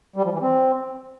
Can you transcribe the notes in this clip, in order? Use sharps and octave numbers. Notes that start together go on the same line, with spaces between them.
G3
F3
E3
C4